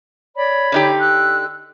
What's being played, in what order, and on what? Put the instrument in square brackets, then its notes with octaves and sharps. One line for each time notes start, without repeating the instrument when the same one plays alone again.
[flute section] C#5 D5 B5
[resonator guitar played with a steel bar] D3 D#4 G4
[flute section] E6 F#6